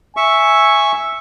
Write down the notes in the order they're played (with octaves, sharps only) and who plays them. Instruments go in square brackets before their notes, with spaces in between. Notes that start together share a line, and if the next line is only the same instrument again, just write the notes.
[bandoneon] E5 C#6 [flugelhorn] G#5